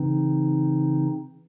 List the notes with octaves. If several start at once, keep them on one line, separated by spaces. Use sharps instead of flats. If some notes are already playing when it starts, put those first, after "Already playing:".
Already playing: C#3 E3 C4 D#4